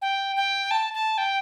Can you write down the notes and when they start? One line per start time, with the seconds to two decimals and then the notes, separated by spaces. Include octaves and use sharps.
0.02 G5
0.36 G5
0.71 A5
0.94 A5
1.18 G5